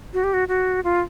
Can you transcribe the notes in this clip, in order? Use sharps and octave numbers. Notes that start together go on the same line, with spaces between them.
F#4
G4
F#4
F#4
F4